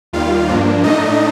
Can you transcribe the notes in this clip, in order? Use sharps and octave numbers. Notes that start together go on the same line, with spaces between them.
D#2 D#3 G3 F4 F5
G2 F3 A#3 D4
A2 A3 D4 D#4 D#5